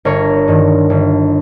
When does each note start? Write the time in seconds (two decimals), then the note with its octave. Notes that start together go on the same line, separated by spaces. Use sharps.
0.05 G1 A#4 C#5
0.48 G2 D#3
0.90 G1